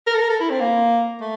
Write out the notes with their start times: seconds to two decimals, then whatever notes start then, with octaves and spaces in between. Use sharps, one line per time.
0.07 A#4
0.15 A4
0.22 A#4
0.30 A4
0.40 E4
0.50 C4
0.60 A#3
1.21 A3